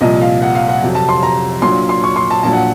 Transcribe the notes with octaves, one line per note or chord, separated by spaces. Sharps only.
C2 A#2 F3 D#5
F5
F#5
F5
F#5
F2 C3 F#3
A5
C6
A#5
A#1 A#2 F#3 C6
C6
C#6
C6
A5
A#1 A#2 F#3 A5
F#5